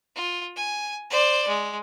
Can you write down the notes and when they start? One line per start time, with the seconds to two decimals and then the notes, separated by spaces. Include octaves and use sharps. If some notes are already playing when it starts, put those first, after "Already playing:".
0.16 F4
0.56 G#5
1.10 C5 D5
1.48 G#3